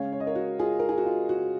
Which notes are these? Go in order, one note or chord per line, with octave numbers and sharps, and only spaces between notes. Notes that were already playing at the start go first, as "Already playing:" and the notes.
Already playing: C#3 G#3 C#4 C#5 F5
C#5
D#5
A#4 C#5
F#4
F4 G#4
A#4
G#4
F#4
F4
F#4